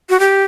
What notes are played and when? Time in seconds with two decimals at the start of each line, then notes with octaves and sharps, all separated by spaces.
0.10 F#4
0.20 G4